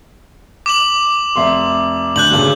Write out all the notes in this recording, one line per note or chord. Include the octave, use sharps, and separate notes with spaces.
D6 E7 F#7
F1 E5 C6
D2 F#6 G6 F#7
G2 A#2 C#3